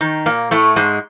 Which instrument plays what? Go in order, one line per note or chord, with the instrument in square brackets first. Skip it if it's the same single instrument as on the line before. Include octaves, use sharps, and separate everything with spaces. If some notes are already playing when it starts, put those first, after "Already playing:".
[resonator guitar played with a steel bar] D#3 D#4
A#2 A#3
A2 A3
G#2 G#3